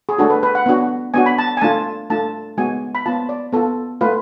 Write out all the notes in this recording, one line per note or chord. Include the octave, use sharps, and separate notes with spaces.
G#4
A3 D4 F#4 A4
B4
B4
F#5
B3 D4 F#4
B3 D4 F#4 G#5
B5
A5
G#5
A3 D4 F4 A5
A3 D4 F4 A5
G#3 B3 F#4 G#5
B5
B3 F4 A5
D5
B3 F4 A4
A3 F4 B4